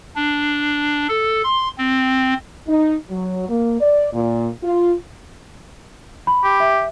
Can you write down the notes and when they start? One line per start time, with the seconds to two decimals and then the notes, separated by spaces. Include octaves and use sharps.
0.15 D4
1.09 A4
1.44 C6
1.78 C4
2.67 D#4
3.09 F#3
3.48 A#3
3.80 D5
4.13 A#2
4.63 F4
6.27 B5
6.44 G4
6.60 E5